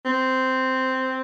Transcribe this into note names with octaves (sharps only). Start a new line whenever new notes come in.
C4